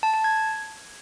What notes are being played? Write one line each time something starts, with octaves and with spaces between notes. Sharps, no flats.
A5
A5
G#6